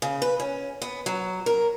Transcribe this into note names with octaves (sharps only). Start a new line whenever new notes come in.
C#3
B4
C#4
B3
F#3
A#4